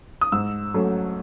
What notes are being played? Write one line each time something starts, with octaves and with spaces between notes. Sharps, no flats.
D#6
G#2 E6
F#3 A3 C#4